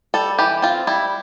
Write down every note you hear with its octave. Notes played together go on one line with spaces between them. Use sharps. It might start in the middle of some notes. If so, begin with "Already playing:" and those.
G3 A4
E3 G4
C4 F4
G3 E4